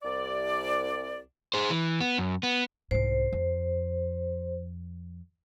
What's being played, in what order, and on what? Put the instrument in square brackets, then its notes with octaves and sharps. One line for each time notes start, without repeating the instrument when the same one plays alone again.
[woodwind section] C2 D5
[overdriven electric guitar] G#4 C5
E3
B3
F#2
B3
[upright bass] C2 G#2 [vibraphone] C5
[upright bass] F2